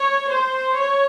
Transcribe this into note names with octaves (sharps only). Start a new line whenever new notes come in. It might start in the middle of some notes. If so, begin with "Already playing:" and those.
Already playing: C#5
C5
C#5